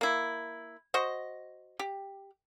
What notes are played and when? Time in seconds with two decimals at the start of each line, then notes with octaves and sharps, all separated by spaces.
0.01 A#3 E4
0.94 F#4 C5 D#5
1.79 G4